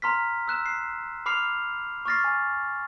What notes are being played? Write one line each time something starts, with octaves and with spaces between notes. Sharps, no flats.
A#5 C6 F6 B6
E6 F#6 E7
C7
B5 D6 F6 C7 F7
C#6 D6 F6 A6 A#6 C7
G#5